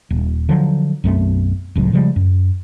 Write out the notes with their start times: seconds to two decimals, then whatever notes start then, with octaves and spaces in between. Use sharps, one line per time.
0.10 D#1
0.49 D3 F3 F#3
1.04 B1 F#2 A3 C4
1.75 F1 C#2 A2 F#3
1.93 C#3 F3 G3 G#3
2.16 F#2